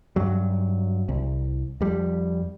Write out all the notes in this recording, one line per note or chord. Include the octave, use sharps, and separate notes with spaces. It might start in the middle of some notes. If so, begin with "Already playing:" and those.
G2 F#3
C2
F2 G3